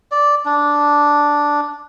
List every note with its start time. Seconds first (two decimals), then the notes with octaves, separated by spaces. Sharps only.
0.12 D5
0.45 D4